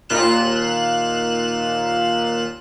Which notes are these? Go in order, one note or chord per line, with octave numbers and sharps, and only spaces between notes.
D#2 A#2 F4 F#6 E7